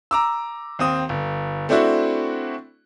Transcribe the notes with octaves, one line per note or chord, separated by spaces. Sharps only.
A#5 D6 E6
D#2 C4 D#6
G1
A3 C4 D4 E4 F#4